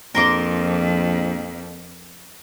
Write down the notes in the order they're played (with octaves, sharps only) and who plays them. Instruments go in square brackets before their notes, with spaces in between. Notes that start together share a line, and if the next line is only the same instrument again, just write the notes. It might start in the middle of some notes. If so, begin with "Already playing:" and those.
[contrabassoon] A#1 [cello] F2 [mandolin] A#4 C6 D6